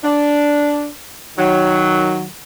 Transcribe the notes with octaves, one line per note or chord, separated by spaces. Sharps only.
D4
D#3 F#3